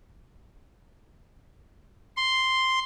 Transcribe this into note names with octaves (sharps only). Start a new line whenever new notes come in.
C6